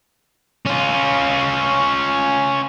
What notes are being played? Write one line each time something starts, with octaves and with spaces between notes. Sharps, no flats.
C#4 F4